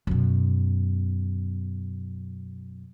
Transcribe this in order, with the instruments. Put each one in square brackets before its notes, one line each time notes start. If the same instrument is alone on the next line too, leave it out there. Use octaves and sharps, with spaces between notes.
[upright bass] F#2 B2